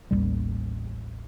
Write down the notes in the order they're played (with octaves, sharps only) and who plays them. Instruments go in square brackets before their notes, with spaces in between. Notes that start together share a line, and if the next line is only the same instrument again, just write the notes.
[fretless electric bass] A1 D#2 G#2 G3